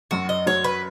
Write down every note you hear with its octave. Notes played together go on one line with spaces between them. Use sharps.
F#2 F#4
D#5
F#3 C#5
B4